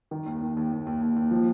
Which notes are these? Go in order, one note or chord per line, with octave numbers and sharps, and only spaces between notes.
D#3
D#2
D#2
D#2
D#2
D#2
D#2
D#2
F3